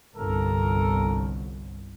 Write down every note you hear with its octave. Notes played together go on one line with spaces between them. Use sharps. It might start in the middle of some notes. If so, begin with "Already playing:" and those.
G1 C2 A4 A#4